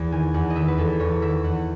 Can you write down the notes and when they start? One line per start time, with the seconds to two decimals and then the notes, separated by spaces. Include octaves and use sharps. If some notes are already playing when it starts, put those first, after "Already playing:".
Already playing: E2
0.12 D#3 G#5
0.34 E2 F#5
0.50 D#5
0.56 D#3 E5
0.68 B4
0.77 E2 A4
1.00 E2 C#5
1.22 D#3 E5
1.44 E2 F#5